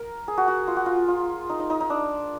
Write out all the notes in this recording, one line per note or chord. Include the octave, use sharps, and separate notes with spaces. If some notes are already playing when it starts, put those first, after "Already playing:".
Already playing: A#4
G#4
F#4
F#4
F4
F#4
F4
F4
D#4
D#4
D#4
D#4
D4